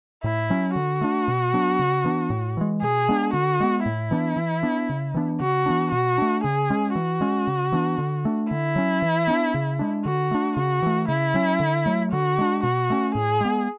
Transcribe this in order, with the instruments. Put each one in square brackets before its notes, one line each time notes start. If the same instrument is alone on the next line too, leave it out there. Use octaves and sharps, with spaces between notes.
[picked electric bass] A2 [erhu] E4
[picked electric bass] F#3 C#4
[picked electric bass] D3 [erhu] F#4
[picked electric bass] A3 D4
B2
F#3 B3 D4
C#3
E3 B3 D4
A2
E3 G#3
[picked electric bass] B2 [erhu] G#4
[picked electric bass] G#3 B3 D4
[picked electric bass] D3 [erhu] F#4
[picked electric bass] G#3 B3
[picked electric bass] A2 [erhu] E4
[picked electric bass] E3 B3 D4
E3
B3 D4
C#3
E3 B3 D4
[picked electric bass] C#3 [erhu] F#4
[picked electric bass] E3 B3 D4
[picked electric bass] B2 [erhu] F#4
[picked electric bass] A3 D4
[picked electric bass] C#3 [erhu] G#4
[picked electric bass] G#3 C#4
[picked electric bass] E3 [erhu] F#4
[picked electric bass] G#3 C#4
C#3
E3 B3 D4
D3
A3 D4
[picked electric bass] D3 [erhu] E4
[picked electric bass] F#3 C#4
E3
B3 D4
C#3
G#3 D4
[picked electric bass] D3 [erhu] F#4
[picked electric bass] A3 D4
[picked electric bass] C#3 [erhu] F#4
[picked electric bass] E3 A3
[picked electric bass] C#3 [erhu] E4
[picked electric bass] F#3 C#4
D3
F#3 A3
[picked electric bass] D3 [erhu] F#4
[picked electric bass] G#3 D4
[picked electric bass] B2 [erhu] F#4
[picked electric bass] A3 C#4
[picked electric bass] A2 [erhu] G#4
[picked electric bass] G#3 B3